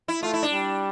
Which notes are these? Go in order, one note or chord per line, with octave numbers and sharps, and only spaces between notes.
E4
A3 F4
E4
D4
G3